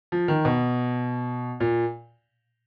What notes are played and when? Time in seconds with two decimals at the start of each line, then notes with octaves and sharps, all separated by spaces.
0.12 F3
0.28 D#3
0.45 B2
1.60 A#2